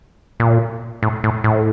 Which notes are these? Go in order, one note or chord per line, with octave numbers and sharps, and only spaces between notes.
A#2
A2
A2
A2